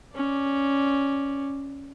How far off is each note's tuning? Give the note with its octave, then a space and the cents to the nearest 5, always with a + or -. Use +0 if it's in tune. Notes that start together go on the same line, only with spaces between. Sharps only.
C#4 +0 D5 +0